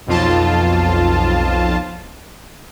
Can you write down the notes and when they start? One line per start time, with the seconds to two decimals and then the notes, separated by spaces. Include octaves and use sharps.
0.07 B1 F2 F4 A5